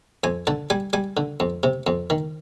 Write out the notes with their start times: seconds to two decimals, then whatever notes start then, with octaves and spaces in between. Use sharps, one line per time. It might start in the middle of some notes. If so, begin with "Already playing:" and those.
0.24 F2 G#5
0.47 D3 A5
0.70 G3 G#5
0.93 G3 G#5
1.17 D3
1.40 F2
1.63 C3
1.87 F2
2.10 D#3